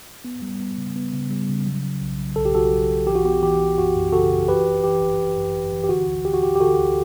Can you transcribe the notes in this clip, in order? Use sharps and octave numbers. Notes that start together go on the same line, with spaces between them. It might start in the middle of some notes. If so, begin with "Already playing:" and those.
B3
G3
B3
C#3
B3
C#3
G3
C#3
F#3
F#3
B1
F#3
B1 A4
G4
B1 F#4 A4
F#3
B1
E3 G4
F#4
B3 G4
E3 G4
E3
F#2 F#4
F#2
C#3 F#4 A4
F#2
E3 G4 B4
G1
E3 G4
G1
G1
F#2
G1
E3
G4
D3 F#4
D2
D2 G4
F#4
D2 G4
G4
D3 F#4 A4
D2